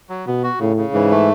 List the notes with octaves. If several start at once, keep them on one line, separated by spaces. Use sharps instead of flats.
F#3
B2 B3
F#4
A2 C#3
C#3
G#2 E3
A3